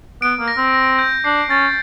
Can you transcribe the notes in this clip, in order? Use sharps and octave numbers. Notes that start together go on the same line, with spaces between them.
B3 D7
A#3
A#6
C4
A#6
G6
D4 C7
C#4 A6